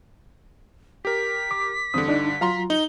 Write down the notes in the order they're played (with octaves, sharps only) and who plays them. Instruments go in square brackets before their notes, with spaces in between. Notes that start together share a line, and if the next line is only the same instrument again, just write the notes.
[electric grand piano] G4 A#4 [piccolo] B6
[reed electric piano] D6
[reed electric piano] E2 C4 D#6 [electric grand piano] G2 D3
[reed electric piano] D4 D#4
[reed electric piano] F#3 F4 [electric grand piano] F5 A#5 C6
[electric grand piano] D#4 [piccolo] G7